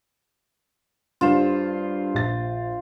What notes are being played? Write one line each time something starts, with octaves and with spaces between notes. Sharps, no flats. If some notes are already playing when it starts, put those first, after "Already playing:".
G2 F4 C5 E7
A#1 A6